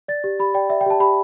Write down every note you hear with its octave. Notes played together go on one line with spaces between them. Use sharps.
D5 A6
G4
G4 B5
D5 G5
D5 E5
G5
G4 A5
G4 B5